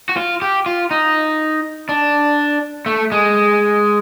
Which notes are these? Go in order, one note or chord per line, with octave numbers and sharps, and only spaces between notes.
F#4
F4
G4
F4
D#4
D4
A3
G#3